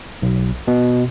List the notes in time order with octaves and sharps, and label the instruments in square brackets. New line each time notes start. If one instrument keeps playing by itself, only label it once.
[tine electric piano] B1
B2